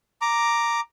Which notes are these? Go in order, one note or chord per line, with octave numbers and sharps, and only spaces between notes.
A#5 D6